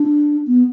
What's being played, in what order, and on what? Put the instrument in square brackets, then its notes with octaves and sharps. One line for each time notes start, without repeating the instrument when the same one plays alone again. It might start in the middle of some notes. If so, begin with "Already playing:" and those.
Already playing: [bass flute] D4
B3